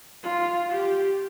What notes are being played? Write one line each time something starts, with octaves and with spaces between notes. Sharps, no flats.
F4
G4